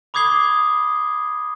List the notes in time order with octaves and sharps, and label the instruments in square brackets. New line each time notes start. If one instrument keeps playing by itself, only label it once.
[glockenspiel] B5 D6 D#6 G#6 C7 G7